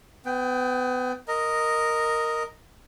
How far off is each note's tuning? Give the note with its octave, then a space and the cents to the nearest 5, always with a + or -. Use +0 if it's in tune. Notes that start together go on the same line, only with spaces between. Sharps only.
B3 +30 G5 +0
A#4 -5 D#5 +0